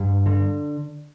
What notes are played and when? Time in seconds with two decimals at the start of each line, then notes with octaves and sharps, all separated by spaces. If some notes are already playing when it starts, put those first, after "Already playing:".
Already playing: G2
0.26 D3